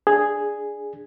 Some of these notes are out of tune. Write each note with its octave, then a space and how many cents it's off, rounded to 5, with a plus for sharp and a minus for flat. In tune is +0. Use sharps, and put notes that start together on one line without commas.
D4 +0 G#4 +0